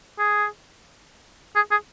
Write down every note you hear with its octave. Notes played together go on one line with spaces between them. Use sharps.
G#4
G#4
G#4